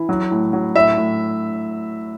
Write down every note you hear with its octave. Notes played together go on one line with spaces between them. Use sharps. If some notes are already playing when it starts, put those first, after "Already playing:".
Already playing: E3
F#3
A2
F#3
A2 E5
A2